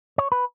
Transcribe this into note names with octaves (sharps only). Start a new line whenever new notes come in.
C#5
B4